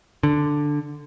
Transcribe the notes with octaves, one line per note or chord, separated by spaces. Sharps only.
D3